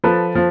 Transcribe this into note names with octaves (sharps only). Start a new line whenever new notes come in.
F3 A4 B4
F3